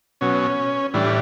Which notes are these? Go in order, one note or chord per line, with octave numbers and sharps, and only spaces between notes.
B2 F#3 C#4
A2 E3 G3 D4